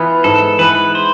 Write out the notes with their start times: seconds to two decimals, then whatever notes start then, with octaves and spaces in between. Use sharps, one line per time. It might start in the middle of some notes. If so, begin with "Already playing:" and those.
Already playing: E3 B3 F4
0.24 G#2 A4
0.59 E3 B3 B4
0.95 C5